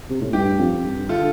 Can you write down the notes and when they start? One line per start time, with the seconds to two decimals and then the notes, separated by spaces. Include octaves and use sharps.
0.10 C3
0.21 A2
0.33 G2 G4
0.59 F2
0.85 G2
1.09 D3 F4 A4